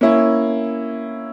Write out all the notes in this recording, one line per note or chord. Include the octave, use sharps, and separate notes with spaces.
A#3 C#4 E4